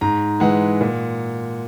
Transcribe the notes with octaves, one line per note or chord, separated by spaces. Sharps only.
G#2 A#5
E3 G#3 F#5
A#2